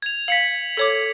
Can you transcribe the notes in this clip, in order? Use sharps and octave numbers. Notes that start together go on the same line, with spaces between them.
G#6 F7
F5 B6 C#7 F#7
A4 C#5 D6